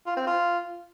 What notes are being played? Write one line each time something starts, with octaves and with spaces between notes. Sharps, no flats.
F4
C4
F4